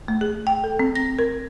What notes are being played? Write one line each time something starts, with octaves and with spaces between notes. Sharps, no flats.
A3
G#4
G5
A4
C4
A#6
A#4